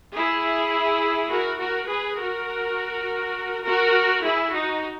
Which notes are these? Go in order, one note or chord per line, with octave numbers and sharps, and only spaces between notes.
E4 G#4
F#4 A#4
F#4 A#4
G#4 B4
F#4 A#4
F#4 A#4
E4 G#4
D#4 F#4